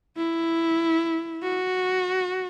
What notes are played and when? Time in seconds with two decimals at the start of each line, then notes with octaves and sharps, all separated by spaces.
0.17 E4
1.42 F#4